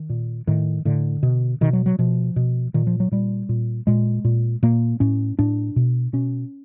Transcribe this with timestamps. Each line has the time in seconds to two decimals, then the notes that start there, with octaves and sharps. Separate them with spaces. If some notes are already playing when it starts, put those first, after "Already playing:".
Already playing: D#3
0.10 A#2
0.47 A2 D#3
0.85 A2 D3
1.23 B2
1.61 B2 D#3
1.73 F#3
1.86 F#3
1.99 B2 F3
2.36 B2
2.74 A#2 D#3
2.87 F3
3.00 F#3
3.12 A#2 G3
3.49 A#2
3.87 A#2 G#3
4.25 A#2
4.63 A#2 A#3
5.00 A2 C#4
5.39 A2 D4
5.76 B2
6.13 B2 C#4